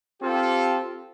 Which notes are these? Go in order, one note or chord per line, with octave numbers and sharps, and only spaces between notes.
C4 F4 G4 A4